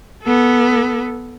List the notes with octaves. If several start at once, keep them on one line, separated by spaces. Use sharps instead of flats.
B3 A4